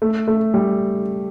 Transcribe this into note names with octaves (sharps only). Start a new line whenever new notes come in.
A3
A3
G3